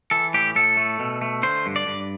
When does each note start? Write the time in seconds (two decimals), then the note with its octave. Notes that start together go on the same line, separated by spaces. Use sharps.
0.11 E3 A4
0.34 A2 G4
0.56 A2 A4
0.77 A3
0.99 B2
1.21 A3
1.43 D3 C5
1.66 G2
1.76 D5
1.87 G2